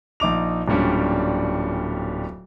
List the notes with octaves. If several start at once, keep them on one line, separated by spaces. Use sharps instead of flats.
A#1 D#4 D6 F7
D1 A#2 G3 C#4 D4